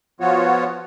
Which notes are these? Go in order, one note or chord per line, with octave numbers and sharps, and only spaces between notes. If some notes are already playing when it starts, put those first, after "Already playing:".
F3 B3 F4 F#4 C#5